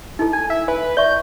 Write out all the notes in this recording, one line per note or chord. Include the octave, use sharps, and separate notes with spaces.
D#4 E4 A4
G#5
E5
B4 G#5
D5 E5 C#6 G6